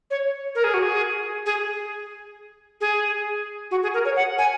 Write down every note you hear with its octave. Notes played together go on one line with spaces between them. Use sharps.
C#5
A#4
G#4
F#4
G#4
G#4
G#4
F#4
G#4
A#4
C#5
F#5
G#5